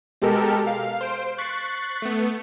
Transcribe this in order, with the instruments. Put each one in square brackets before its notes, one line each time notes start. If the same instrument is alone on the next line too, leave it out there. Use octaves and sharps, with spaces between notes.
[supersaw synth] B2 G#3 G4 A4 A#4
F5
C5 D7
C#6 F#6 A6 B6 C7
A3 B3